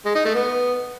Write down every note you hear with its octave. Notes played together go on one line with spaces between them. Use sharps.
G#3
D#4
A3
B3